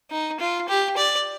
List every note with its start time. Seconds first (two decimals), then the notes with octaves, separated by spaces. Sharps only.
0.11 D#4
0.40 F4
0.68 G4
0.97 D5